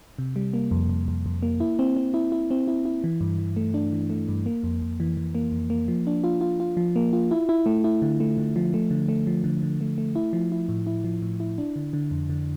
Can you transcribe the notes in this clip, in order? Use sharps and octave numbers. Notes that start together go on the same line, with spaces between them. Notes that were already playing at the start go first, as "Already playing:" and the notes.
C3
G3
A#3
F2
F2
F2
F2
A#3
E4
C4
C4
E4
E4
C4
E4
E4
E3
G2
E3
A3
D4
E3
A3
G2
A#3
F2
F2
E3
E3
A#3
F2
A#3
F3
D4
F4
F4
F4
F3
A#3
F4
E4
E4
A3
E4
D3
A3
D3
F3
A3
D3
A3
F3
D3
D3
A3
A3
E4
F3
E4
A2
E4
F3
A2
E4
D4
D3
D3
F2
D3